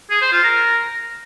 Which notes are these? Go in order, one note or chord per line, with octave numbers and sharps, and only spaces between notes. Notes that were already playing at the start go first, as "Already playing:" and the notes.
G#4
C5
F4
A#4